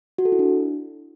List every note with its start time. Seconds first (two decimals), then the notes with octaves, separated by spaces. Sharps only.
0.18 F#4
0.25 A4
0.32 E4
0.39 D4